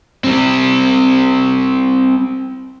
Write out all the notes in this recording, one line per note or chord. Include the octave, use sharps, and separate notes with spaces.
G3 C4